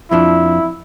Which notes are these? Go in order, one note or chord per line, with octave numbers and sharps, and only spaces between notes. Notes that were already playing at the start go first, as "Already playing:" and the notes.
F2 F3 D4 E4